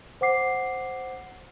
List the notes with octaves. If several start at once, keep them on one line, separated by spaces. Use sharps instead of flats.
C5 F#5 D6 C7